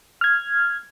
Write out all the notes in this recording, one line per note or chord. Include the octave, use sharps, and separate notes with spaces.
F6 G#6